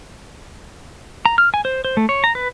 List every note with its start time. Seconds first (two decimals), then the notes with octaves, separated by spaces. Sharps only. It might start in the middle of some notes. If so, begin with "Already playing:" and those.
1.26 A#5
1.38 F6
1.54 G#5
1.65 C5
1.85 C5
1.97 A3
2.09 C#5
2.24 A#5
2.35 B4